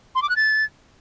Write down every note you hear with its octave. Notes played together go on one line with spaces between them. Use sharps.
C6
D6
F#6
A6